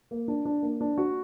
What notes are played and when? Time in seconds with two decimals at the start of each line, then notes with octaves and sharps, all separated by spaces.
0.11 A#3
0.28 D4
0.45 D4
0.62 A#3
0.81 D4
0.98 F#4